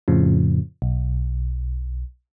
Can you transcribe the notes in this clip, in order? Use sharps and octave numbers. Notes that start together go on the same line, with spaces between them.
F2 A2 C#3 F3
B1